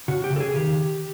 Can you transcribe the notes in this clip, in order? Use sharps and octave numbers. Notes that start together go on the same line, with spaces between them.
C#3 F#4
G4
C#3 A4
G#4
D#3 G4